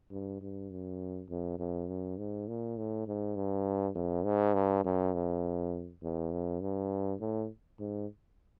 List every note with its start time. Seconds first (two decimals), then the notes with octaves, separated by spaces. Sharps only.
0.11 G2
0.41 G2
0.71 F#2
1.29 F2
1.59 F2
1.88 F#2
2.18 G#2
2.48 A#2
2.77 A2
3.07 G#2
3.36 G2
3.95 F2
4.25 G#2
4.54 G2
4.84 F#2
5.13 F2
6.02 E2
6.32 F2
6.61 G2
7.20 A2
7.79 G#2